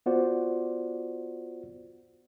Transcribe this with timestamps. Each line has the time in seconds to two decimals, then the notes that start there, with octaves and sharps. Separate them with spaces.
0.06 B3 F4 F#4 C5 D5 F#5